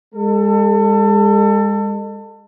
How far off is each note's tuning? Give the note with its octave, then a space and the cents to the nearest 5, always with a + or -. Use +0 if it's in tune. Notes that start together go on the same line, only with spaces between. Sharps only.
G#3 -30 A4 +25